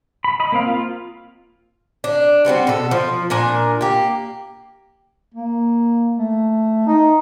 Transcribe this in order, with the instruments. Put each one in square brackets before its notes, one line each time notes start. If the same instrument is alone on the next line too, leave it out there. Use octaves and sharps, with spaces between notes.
[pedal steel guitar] B5
D#5 B5
A#3 C4 F5
F4
[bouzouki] D4
G3 B3 C4 F#4
B2 A4
F3
A#2 D4 A#4 G#5
A#3 G4
[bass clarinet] A#3
A3
D#4